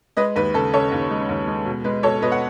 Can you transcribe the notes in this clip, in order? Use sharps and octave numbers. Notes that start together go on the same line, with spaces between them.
G#3 B4 D#5
D#2 B4
C#3 A4
C#3 A4 C#5
D#2
G#3
D#2
G#3
B2
G#3 B4
B2 A4 C#5
B2 B4 D#5
F#5